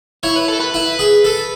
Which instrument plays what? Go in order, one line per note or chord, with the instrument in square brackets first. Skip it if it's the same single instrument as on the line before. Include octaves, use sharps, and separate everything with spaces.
[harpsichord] E4 [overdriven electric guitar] C#5
[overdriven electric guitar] B4
A4
B4
[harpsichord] E4
G#4
A4